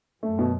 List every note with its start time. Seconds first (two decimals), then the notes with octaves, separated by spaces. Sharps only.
0.23 F#2 A3
0.39 B2